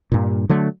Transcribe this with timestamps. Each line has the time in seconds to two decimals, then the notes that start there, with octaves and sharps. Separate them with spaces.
0.12 G2 A#2
0.49 D3 F#3 A3